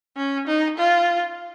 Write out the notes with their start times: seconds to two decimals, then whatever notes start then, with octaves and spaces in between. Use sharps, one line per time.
0.17 C#4
0.47 D#4
0.77 F4